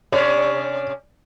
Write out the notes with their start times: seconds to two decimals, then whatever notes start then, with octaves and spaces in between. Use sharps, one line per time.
0.12 C3 C#4 D4 D5